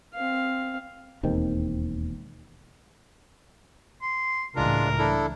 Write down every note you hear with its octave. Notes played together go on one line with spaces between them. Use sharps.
C4 F5
E1 D#2 D#3 C4
C6
C#2 A2 E3 G#3 D4 F4 A#4
D4 E4 A4